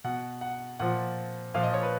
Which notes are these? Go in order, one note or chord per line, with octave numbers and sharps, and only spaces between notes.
B2 F#5
F#5
A#2 F3 F#5
A#2 F3 F5
D#5
C#5
B4